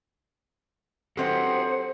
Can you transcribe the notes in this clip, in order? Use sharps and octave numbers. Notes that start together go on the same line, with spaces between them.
F#3 C4 G4 A4 C5 D#5 F#5